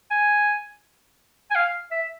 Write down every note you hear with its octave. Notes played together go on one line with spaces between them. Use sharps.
G#5
G#5
F5
E5